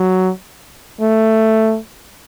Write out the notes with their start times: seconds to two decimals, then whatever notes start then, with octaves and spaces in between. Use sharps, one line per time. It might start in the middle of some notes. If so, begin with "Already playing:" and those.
Already playing: F#3
1.01 A3